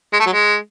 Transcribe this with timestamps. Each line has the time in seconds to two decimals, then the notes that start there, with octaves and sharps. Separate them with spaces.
0.13 G#3
0.20 A3
0.26 F#3
0.33 G#3